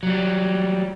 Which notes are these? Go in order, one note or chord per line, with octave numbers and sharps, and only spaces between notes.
F#3 G3